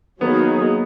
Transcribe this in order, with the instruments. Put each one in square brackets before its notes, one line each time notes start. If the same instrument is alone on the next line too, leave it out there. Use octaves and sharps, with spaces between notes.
[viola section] D#3 F#3 A#3 D#4 G#4 [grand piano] B3